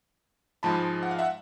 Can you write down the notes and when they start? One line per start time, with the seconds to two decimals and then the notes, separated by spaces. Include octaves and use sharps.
0.63 G#2 F3 G#3 A5 B5
1.03 F#5
1.11 F5
1.18 E5 F#5